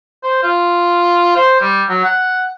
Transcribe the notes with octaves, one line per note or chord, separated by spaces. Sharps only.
C5
F4
C5
G3
F#3
F#5